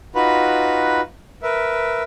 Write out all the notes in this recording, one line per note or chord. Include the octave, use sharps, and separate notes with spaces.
D#4 F4 F#4 B4 B5
A#4 B4 E5